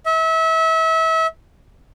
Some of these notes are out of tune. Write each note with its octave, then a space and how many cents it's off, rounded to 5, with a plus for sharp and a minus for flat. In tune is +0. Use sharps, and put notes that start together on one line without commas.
E5 -30